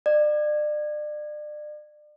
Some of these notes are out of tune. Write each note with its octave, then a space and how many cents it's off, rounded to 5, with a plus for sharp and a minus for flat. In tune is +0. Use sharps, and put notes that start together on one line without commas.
D5 +35